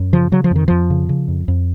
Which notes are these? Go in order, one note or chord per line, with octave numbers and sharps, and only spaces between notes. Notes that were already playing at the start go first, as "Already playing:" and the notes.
Already playing: F#2
C#3 F3
C#3 F#3
F3
F2 D#3
F2 F3
C#3
C#3
F2
F2